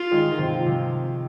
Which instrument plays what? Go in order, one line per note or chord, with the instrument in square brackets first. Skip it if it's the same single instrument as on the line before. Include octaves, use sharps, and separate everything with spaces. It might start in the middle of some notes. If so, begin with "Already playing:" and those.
Already playing: [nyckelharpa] F4
[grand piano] D#3 G#3
D#3
C3 F3
C3 F3